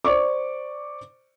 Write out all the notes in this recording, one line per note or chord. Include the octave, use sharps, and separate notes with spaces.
C5 D5 C#6 D6